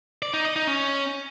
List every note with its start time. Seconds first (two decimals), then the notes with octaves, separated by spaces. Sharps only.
0.22 D5
0.34 D#4
0.45 D#5
0.56 D#4
0.67 C#4